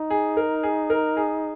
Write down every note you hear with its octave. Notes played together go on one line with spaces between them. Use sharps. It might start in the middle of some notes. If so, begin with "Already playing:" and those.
Already playing: D#4
G#4
A#4
G#4
A#4
G#4